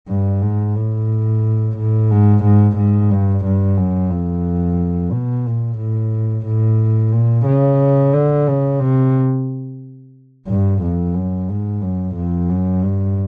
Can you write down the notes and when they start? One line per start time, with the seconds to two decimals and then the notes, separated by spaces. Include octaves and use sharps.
0.08 G2
0.42 G#2
0.76 A2
1.77 A2
2.10 G#2
2.43 G#2
2.76 G#2
3.10 G2
3.45 G2
3.78 F#2
4.11 F2
5.12 B2
5.46 A#2
5.78 A2
6.46 A2
7.12 A#2
7.46 C#3
8.13 D3
8.47 C#3
8.80 C3
10.47 G2
10.82 F2
11.15 F#2
11.49 G#2
11.81 F#2
12.15 F2
12.49 F#2
12.82 G2